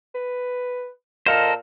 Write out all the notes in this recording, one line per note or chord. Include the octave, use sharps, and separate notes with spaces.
B4
A#2 A4 A#4 C5 D#5 F5 F6